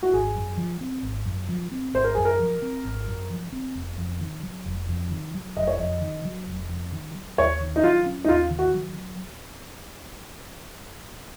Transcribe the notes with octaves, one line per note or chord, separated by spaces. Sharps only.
F#4
G#1 G#4
F#2
F3
C4
G#1
F#2
F3
C4
G#1 C5
A#4
F#2 G#4
A#4
F3
C4
G#1
F#2
F3
C4
F1
F2
D#3
F#3
F1
F2
D#3
F#3
F1 D#5
C#5
F2 D#5
D#3
F#3
F1
F2
D#3
F#3
D#2 C#5
D#3
D#4
F#3 F4
C#4
D#4
D#2 F4
D#3
F#4
F#3